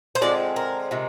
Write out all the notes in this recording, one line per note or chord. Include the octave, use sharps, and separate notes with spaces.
C5
D3 F3 G#3 C4 D5
A#4
C3 D#3 G#3